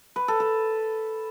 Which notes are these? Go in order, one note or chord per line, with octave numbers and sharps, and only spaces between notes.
B4
A4
A4